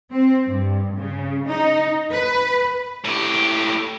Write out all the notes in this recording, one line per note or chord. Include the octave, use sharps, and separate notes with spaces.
C4
G2
C#3
D#4
B4
A2 G4